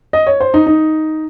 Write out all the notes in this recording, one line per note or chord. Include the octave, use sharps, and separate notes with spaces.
D#5
C#5
C5
D#4
D#4